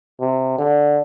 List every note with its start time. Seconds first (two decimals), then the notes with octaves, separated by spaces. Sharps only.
0.20 C3
0.58 D3